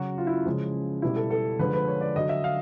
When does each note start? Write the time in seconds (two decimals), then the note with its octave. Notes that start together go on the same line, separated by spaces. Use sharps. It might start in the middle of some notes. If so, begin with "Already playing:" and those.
Already playing: C#3 F#3 F#4
0.18 F4
0.27 E4
0.45 C#3 F3 G#3
1.02 B2 G3 E4
1.16 A4
1.30 A4
1.59 D3 F3 G#3 B4
1.73 B4
1.88 C#5
2.01 D5
2.16 D3 F#3 D#5
2.29 E5
2.44 F5